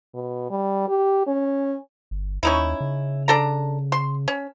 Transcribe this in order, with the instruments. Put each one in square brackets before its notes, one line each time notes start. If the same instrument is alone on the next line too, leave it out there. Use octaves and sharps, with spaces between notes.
[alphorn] B2
G3
G4
C#4
[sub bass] G1
[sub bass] D#2 [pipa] C#4 D#4 E4
[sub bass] C#3
[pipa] D4 A4 A#5
C6
C#4